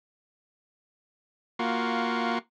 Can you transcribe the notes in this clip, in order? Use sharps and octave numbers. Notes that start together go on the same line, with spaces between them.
A#3 F4 F#4